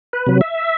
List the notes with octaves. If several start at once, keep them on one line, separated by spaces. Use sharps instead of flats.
B4
C3 F#3
E5